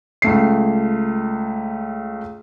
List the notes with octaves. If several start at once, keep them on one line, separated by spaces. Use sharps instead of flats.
C#2 A3 C7